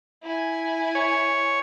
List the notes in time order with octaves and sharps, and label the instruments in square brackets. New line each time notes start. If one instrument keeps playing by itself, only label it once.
[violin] E4 G#5
[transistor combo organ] C#5